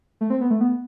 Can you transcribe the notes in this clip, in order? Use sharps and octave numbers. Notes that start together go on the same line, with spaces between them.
A3
C4
B3
A3
B3